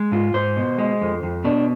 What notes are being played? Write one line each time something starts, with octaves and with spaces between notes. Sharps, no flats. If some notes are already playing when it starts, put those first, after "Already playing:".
Already playing: G#3
G#2 F4
G#2 C5
B2
G#3
F2
F2
B2 D4